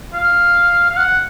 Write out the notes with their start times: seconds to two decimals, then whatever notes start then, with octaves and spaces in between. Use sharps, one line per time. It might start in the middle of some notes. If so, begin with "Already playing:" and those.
0.14 F5
0.90 F5
0.97 F#5